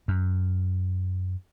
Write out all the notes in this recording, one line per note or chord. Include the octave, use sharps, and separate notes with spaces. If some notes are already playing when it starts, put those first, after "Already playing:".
F#2